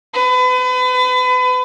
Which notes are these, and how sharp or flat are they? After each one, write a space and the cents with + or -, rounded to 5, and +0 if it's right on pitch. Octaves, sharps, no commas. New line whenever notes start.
B4 +35